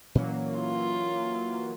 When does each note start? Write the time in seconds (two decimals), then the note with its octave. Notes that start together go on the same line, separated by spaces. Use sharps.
0.15 A#2 E3 F#3 A#3 C#4
0.57 F4